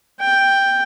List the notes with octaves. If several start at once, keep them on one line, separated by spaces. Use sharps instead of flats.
G5